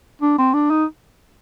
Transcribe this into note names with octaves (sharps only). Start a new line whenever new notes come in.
D4
C4
D4
D#4